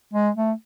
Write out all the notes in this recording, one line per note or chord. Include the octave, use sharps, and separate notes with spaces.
G#3
A3